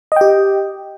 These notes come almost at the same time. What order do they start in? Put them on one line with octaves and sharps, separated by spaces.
D#5 G5 G4